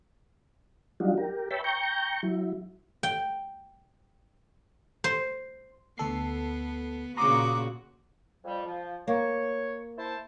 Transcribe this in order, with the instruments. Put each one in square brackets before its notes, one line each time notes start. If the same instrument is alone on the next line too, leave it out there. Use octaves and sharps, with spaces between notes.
[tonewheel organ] F#3 G3 D4 D#4 F4 F#4
G4 A#4
B4 C#5 E5 G5 A5 B5
G5 A#5 C#6 G6
F#3 E4
[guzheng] G5
C5
[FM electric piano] D2 A4 C7 [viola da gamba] B3
[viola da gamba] A#2 C#3 F#4 [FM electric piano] A#5 C6 D#6 [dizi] D6
[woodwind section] F2 G3
F3
[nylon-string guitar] A#3 [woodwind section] C#5
[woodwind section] E4 C5 A5